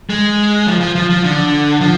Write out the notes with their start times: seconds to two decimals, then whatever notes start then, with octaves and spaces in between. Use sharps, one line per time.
0.10 G#3
0.67 F3
0.81 F3
0.95 F3
1.10 F3
1.24 D3
1.81 F3